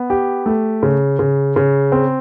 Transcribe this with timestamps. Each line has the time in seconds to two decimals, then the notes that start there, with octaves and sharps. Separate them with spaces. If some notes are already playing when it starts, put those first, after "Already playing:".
Already playing: B3
0.10 G4
0.46 A3
0.83 C#3
1.19 C#3
1.56 C#3
1.92 C4